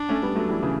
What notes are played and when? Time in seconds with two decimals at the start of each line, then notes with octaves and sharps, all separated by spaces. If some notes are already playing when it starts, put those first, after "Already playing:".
Already playing: D4
0.09 A3 C#4
0.23 G3 B3
0.36 F#3 A3
0.49 E3 G3
0.62 C#3 E3